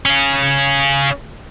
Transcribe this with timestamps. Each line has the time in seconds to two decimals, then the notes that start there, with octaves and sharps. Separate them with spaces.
0.06 C#3 C#4